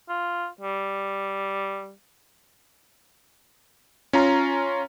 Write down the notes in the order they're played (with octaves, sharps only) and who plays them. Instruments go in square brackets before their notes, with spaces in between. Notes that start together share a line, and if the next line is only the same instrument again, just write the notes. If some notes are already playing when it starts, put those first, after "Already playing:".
[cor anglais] F4
G3
[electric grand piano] C#4 F4 A#5